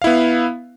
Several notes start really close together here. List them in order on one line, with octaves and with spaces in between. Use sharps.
F5 E4 B3